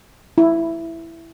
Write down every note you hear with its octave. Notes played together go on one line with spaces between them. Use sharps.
E4